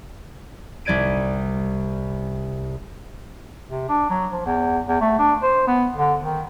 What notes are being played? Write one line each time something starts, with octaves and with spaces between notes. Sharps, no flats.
C2 G3 D5 G#6 D7 D#7
C3
D4
F#3
F3
E2
E2
A3
D4
C5
B3
D3
D#3